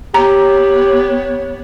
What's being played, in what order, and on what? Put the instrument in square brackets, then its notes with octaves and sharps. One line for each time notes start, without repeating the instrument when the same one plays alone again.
[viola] B3 [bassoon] G4 [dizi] C#5 [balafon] A#5